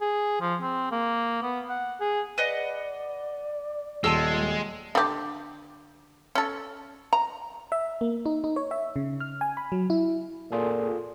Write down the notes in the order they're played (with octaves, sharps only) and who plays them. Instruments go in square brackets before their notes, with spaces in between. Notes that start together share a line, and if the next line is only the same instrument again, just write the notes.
[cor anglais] G#4
F3
C4
A#3
B3
F#5
G#4
[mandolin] B4 D#5 F#5 [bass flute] D5
[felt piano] D#1 [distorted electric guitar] G#3 [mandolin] F4 A5 E6
[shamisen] D3 G4
C#4 A4
A#5
[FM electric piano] E5
A#3
D#4
D#4
C#5
E5
C#3
F6
G#5
B5
F#3
E4
[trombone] A#2 [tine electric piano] F4 G#4 A4